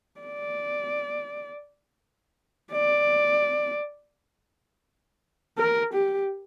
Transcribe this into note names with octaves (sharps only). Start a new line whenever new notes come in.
D5
D5
A#4
G4